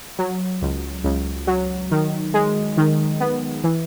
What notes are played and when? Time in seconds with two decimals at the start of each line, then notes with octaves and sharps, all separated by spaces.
0.19 F#3
0.62 C#2
1.04 C#2
1.47 F#3
1.91 D#3
2.34 G#3
2.77 D#3
3.20 B3
3.64 E3